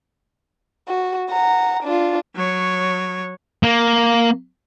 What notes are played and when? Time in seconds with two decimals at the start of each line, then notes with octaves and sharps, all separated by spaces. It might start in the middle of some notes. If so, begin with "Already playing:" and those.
0.88 F#4
1.29 F#5 A#5
1.83 D4 F4
2.35 F#3 C#5
3.63 A#3